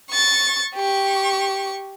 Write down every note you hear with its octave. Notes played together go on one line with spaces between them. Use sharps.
C#6 A6
G4 C#6